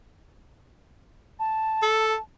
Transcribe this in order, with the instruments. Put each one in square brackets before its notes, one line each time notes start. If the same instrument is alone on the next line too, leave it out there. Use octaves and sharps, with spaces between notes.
[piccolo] A5
[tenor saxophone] A4